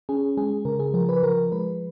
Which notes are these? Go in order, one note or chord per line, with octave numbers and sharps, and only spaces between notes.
C#4 G#4
G#3 G#4
C#3 A#4
G#4
F3 A#4
B4
F3 A#4
G#3 B4